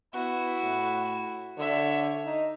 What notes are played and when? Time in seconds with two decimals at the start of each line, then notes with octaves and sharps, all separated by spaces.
0.14 B3 E4 F#4
0.63 A2
1.58 D3 C#5 E5
2.25 D#4